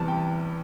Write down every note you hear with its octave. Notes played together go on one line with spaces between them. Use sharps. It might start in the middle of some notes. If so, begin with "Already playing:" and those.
Already playing: E2 C3 E3 G3 B3 A5
G5